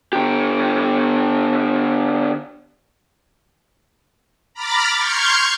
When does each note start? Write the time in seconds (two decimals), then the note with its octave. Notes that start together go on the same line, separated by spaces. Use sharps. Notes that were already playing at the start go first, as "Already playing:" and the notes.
0.13 D3 G4
4.54 A#5 B5 D6 F6 A6
4.96 C6 C#6 F6 G6 G#6 C#7